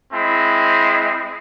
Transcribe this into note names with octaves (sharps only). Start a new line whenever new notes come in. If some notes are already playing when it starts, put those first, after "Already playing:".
G#3 C4 E4